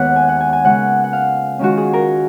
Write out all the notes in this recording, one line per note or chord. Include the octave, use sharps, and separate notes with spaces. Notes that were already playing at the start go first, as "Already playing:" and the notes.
Already playing: D#2 D#3 G#3 B3 B4 C#5 F#5
G#5
F#5
G#5
G#5
C#3 G#3 C#4 F4 F#5
F#5
F5
D#3 G#3 C#4 F4 F#4
G#4
A#4